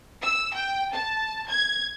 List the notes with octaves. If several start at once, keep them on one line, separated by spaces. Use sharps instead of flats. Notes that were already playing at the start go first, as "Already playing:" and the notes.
E6
G5
A5
G#6